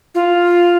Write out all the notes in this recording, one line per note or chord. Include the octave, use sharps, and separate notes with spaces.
F4